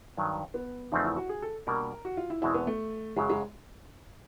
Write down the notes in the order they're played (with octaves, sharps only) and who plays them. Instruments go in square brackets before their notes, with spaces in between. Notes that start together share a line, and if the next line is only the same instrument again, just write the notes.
[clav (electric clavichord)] G2 D#3 F#3
[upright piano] B3
[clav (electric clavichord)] E2 C#3 F3 A3 C4 [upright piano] D#4
[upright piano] E4
F#4
G#4
A4
[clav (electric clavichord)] B2 G3 A#3 D4 [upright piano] A#4
[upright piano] F#4
F4
E4
[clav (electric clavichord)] E2 B2 G#3 C4 [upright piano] E4
[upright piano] B3
A3
[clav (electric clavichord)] F#2 C#3 F#3 [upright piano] G#3
[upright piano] G#3